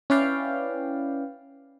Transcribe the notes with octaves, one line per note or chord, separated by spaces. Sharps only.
C#4 E4 B4 D5 F5 G5